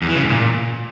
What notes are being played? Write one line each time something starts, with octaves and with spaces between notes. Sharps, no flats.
E2
E3
C#3
G#2
A#2